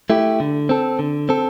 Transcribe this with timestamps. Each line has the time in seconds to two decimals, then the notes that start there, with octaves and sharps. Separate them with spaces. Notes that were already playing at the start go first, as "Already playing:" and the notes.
0.10 A3 E4 G4
0.40 D3
0.69 C4 A4
0.99 D3
1.29 C4 A4